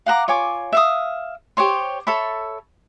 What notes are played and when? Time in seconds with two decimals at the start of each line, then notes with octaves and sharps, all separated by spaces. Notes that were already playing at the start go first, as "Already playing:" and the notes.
0.06 F5 F#5 A#5 D6
0.28 F4 C#5 G#5 D6
0.73 E5 F5 D#6
1.57 G4 C5 C#5 C6
2.07 A4 C#5 E5 B5